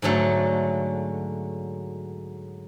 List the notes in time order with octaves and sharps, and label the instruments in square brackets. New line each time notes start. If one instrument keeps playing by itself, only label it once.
[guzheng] G#2 D3 F#3 A3